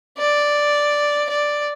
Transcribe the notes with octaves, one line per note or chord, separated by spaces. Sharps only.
D5
D5